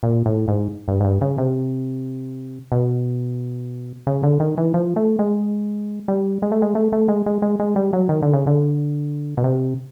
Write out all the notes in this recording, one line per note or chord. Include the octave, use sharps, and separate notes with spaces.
A#2
A2
G#2
G2
G#2
G2
C#3
C3
B2
C#3
D3
D#3
E3
F3
A3
G#3
G3
G#3
A3
G#3
A3
A3
G#3
G#3
G#3
G#3
G3
F#3
D#3
D3
C#3
D3
B2
C3